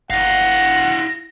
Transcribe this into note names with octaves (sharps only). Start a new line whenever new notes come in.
G1 E4 F5 F#5 A#6